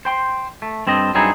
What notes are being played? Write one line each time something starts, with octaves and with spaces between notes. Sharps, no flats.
C5 G5 C6
A3
G2 C4 A4 D#5
G2 F#3 C4 D#4 E4 G#4